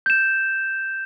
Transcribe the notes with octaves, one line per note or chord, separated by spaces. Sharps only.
G6 E7